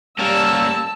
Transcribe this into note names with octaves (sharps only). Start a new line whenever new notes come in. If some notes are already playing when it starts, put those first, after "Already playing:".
G3 A#3 C#4 A5 E6